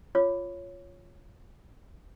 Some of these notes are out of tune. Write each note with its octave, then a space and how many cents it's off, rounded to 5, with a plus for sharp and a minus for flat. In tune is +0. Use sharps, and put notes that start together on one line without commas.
F4 +0 C#5 +0 D6 +0